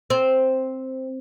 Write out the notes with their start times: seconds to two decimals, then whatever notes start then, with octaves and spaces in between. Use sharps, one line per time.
0.10 C4